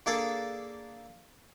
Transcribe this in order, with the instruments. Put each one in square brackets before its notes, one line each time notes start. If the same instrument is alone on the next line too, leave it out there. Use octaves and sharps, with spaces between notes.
[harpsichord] A#3 D4 G#4 A4